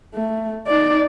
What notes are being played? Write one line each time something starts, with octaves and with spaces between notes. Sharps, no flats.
A3
D#4 D5